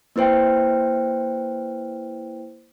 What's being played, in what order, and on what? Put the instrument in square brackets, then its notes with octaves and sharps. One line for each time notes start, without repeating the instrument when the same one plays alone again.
[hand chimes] A#3 E4 B4 C5 G5